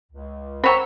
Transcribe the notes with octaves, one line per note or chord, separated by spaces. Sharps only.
C#2
D#3 C5 C#5 F#5 G5 A#5 B5 E6